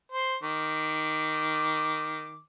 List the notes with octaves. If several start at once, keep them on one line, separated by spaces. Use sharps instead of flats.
C5
D#3 D6